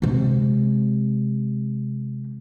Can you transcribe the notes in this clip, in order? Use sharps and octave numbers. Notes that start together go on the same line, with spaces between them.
C3 G#3